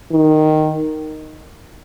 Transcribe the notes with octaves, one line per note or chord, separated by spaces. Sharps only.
D#3